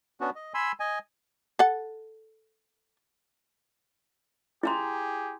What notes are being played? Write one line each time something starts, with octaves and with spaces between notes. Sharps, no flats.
B3 C#4 D4 F#4
D#5
G#5 B5 C6 E6
D#5 G#5
A4 F#5
E4 G4 G#4 A#5 C6